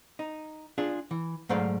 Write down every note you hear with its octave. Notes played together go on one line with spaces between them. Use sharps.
D#4
D4 F4 G#4
E3
G#2 F#3 A3 C5 D5 F5